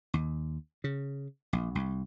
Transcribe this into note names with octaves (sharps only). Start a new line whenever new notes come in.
D#2
C#3
A#1
C2